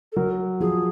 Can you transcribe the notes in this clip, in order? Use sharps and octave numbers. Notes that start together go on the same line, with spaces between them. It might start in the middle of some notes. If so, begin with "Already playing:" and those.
A4
F#3 A#4
F3 G#4